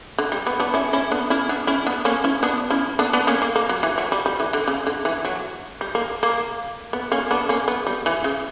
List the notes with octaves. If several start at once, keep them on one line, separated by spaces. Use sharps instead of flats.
D3
G3
B3
B3 D4
C#4 E4
C#4 E4
B3 D4
C#4 E4
B3 D4
C#4 E4
B3 D4
A#3 C#4
C#4 E4
B3 D4
C#4 E4
B3 D4
B3 D4
A#3 C#4
A#3
A#3
F#3
E3
F#3
G3
G3
E3
D3
C#3
D3
E3
F#3
G3
A#3
A#3
B3
A#3 C#4
B3 D4
A#3 C#4
B3
G3
E3
C#3